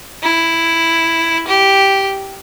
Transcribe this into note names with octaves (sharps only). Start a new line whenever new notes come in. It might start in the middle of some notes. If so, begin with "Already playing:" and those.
E4
G4